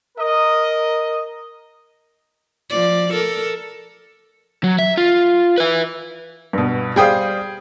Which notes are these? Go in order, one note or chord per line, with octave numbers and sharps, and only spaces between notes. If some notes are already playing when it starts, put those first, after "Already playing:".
A#4 D#5
F3 D5
A4 A#4
F#3
E5
F4
B4 E5
G2 B2
G3 G#4 C5 F5 G5 D#6